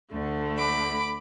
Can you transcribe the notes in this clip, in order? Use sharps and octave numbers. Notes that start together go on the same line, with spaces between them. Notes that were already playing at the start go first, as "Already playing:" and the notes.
D2 D3 A3
B5 D6